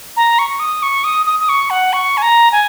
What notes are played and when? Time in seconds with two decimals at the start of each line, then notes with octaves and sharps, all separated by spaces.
0.17 A#5
0.39 C#6
0.60 D#6
0.83 C#6
1.04 D#6
1.26 D#6
1.40 D#6
1.49 C#6
1.70 F#5
1.93 C#6
2.17 G#5
2.22 A#5
2.52 G#5